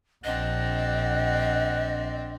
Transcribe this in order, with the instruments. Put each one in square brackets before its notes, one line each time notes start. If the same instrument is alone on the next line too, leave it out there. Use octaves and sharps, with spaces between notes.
[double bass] A#1 [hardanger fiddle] C4 D4 [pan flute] D#5 [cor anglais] F#5